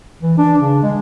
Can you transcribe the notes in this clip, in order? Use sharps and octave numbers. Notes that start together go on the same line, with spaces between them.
E3
D4
C#3
G#3